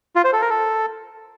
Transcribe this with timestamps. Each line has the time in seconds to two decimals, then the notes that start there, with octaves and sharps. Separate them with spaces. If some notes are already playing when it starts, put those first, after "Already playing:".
0.16 F4
0.24 C5
0.33 A4
0.42 A#4
0.50 A4